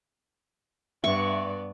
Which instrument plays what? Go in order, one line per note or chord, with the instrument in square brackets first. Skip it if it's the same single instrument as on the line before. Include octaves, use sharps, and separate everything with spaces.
[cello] G2 [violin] B3 D5 [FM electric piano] E5 [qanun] C#6